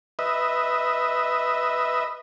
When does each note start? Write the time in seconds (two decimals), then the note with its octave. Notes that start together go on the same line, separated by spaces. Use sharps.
0.19 B4 D#5 E5